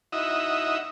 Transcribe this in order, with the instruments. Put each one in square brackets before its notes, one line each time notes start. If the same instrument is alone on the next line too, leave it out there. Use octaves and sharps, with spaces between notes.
[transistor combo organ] D#4 E4 F#4 D#5 E5